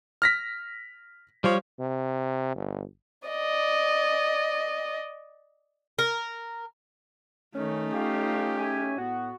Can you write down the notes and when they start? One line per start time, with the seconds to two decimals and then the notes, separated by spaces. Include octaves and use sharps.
0.22 F6 A#6 B6
1.44 F3 G3 C#5
1.80 C3
2.55 G1
3.28 D5 D#5
5.99 A#4
7.55 D#3 A3 C#4 D#4
7.93 B3 F4 G4 F5
8.58 G#4 E5 G#5
8.98 A2 B3 F#4